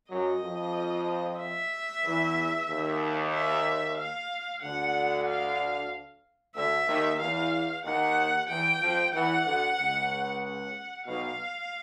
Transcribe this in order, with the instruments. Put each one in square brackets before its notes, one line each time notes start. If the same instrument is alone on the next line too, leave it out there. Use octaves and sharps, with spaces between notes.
[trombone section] F#2 F#3 [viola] D#5
[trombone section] F2 F3
[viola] E5
[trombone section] E2 E3
D#2 D#3
[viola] E5
F5
[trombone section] D2 D3 [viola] F#5
[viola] F5
[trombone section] D2 D3 [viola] E5
[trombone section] D#2 D#3
[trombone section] E2 E3 [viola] F5
[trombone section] D#2 D#3 [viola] F#5
[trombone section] E2 E3 [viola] G5
[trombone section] F2 F3
[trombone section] E2 E3 [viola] F#5
[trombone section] D2 D3
C#2 C#3
[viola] F#5
[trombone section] B1 B2 [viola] F5